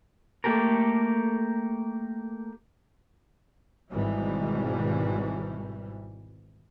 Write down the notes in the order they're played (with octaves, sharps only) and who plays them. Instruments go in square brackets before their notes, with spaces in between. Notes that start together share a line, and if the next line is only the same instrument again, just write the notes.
[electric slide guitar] A3 A#3 G4 A4 A#4
[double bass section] G#1 G#2 B2 E3 G3